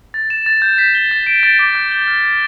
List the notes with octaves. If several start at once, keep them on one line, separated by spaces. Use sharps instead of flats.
A6
E7
A6
G6
B6
G7
A6
D7
A6
D6
G6
G7
F6
B6